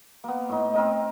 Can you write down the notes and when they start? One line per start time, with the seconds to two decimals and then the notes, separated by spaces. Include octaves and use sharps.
0.24 A#3 B3
0.49 A2 D#4
0.74 C4 D#4 A#4 D#5